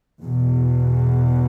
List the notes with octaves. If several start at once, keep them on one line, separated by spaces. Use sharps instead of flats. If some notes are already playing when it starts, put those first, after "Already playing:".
E2 B2